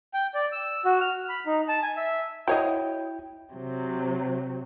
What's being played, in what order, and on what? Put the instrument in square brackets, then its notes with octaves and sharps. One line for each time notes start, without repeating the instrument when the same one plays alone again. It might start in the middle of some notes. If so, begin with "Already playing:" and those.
[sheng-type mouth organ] G5
D5
E6
F#4
F6
B5
D#4
A5
G#5
E5
[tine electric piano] E4 G5 [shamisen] F#4 C#5 D#5
[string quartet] C3 F#3